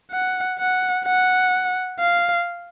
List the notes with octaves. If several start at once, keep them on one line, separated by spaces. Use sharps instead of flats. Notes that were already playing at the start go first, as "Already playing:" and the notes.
F#5
F#5
F#5
F5